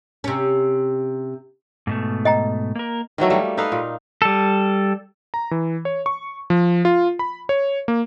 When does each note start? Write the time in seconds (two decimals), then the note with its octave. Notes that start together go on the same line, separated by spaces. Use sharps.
0.24 C3 C#4
1.87 G#2 B2 A3
2.25 D#5 G5 A#5
2.75 A#3 A#4
3.18 D#3 E3 F#3 A3
3.30 G3 A3 A#3
3.57 D#4 A4 B4 F5
3.72 A#2
4.22 G3 A4
5.34 A#5
5.51 E3
5.85 C#5
6.06 C#6
6.50 F3
6.85 F4
7.19 B5
7.49 C#5
7.88 A#3